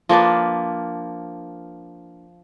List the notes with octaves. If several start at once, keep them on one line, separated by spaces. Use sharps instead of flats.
F3 A#3 D4 B4